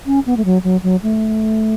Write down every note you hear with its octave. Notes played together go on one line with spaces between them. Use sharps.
C#4
B3
A3
F#3
F#3
F#3
A3